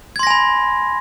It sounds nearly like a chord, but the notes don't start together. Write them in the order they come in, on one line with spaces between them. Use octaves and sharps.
G#6 C6 A#6 G#5 B5